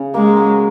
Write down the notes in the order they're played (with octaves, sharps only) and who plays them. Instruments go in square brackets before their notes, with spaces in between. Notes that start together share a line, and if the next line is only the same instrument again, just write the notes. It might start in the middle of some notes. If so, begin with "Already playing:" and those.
Already playing: [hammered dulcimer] C#3
[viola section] G#3 [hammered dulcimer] A#3
[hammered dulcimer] F#3